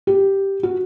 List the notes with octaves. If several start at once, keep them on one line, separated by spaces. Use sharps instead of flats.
G4
F#4